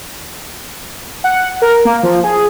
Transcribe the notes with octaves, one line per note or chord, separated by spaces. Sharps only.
F#5
A#4
A#3
F3
G#4